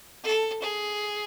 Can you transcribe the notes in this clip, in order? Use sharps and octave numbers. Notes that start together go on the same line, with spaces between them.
A4
G#4